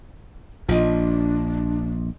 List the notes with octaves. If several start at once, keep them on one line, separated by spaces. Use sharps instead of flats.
A#1 F3 D4 D#5